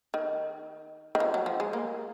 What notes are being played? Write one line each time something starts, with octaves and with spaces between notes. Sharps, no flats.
D#3
D#3
F3
F#3
F3
G#3
A#3